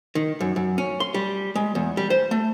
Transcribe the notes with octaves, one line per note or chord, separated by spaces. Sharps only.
D#3
F#2
F#2
C#4
C6
G3
G#3
E2
G3
C5
A3